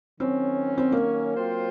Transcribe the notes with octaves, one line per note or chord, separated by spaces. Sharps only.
D#3 F#3 C4 C#4
C4
A#3
F#3 C4 F4 C5